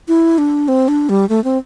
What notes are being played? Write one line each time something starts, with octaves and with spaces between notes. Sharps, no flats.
E4
D4
C4
D4
G3
A3
C4